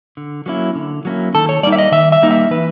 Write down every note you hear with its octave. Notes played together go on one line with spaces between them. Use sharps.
D3
F#3 A#3 C#4 E4
D3
F#3 A#3 C#4 E4
D#3 A4
C#5
G3 A#3 D#4 D5
E5
D#5
D#3 E5
E5
G3 A#3 D#4
E5
E3 B4